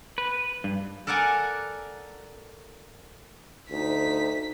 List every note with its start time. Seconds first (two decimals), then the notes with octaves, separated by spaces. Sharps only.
0.18 B4
0.64 G2
1.07 A4 A#4 D5 F#5 G#5 A#5
3.71 D2 D#4 C5 B6